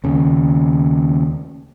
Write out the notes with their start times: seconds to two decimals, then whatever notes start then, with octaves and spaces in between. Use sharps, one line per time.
0.04 D#2 C#3